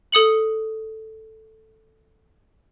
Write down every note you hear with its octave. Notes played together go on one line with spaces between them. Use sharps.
A4 D#6 C#7 F#7